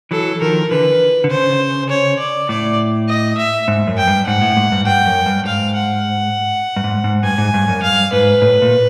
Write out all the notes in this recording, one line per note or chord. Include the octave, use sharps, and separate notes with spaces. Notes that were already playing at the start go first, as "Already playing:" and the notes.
E3 F#3 A4
D#3 F3 A#4
D3 E3 B4
D3
C#3 C5
C#5
D5
A2 D5
D#5
E5
G#2
F#2
G5
G2
G#2 F#5
A2
G#2
G2
G2 G5
F#2
G2
G#2 F5
F#5
G2
G#2
G#2
G2 G#5
G#2
G2
F#2
G2 F5
G#2 B4
A2
A#2